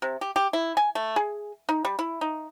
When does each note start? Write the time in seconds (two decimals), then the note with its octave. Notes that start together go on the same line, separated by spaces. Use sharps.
0.02 C3
0.21 G4
0.36 G4
0.53 E4
0.77 G#5
0.95 A3
1.16 G#4
1.69 D#4
1.85 G3
1.99 E4
2.21 D#4